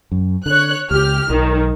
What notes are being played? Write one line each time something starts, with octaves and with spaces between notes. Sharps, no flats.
F#2
D3 C#5 F#6
C#2 G4 F6
B1 D#3